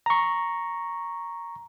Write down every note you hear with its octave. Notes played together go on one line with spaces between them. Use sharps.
A#5 C#6